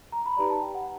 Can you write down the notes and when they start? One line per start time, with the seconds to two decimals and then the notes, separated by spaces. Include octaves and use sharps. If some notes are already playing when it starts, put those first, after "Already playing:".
0.12 A#5
0.26 B5
0.37 D#4 G4 B4 D5 A#5
0.50 A5
0.62 G5
0.74 F#5